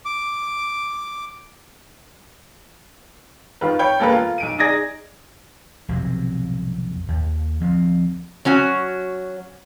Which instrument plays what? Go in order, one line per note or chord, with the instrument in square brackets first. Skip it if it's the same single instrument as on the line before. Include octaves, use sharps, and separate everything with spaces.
[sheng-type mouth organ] D6
[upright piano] D#3 F4 B4
C#5 G5 B5
E1 A#3 A4 B4
F4
B1 D7 D#7
D#4 G#4 D5 D#5 G#6 A#6
[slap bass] B1 F2 C3 F#3
D#2
D2 F3 C4
[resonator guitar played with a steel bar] F#3 C#4 F#4